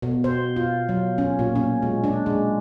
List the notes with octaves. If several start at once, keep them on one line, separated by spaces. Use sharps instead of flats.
B2
C5
F4
F#3
C#4
A#2
C#4
G#3
D4
G#3